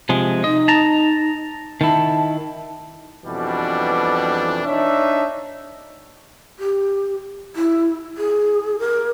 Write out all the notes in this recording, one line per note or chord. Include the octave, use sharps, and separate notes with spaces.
C3 F3 G#3
D#4 D#5
A5 A#5
D#3 E4 A5
F2 B2 E3 G3 D4
D4 D#4 C#5 E5
G4
E4
G#4
A#4